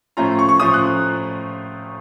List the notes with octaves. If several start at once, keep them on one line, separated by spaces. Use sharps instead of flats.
A2 F3 A3 C#4 F4 A#5
C#6
C#6
A2 F3 A3 C#4 F4 D#6
F#6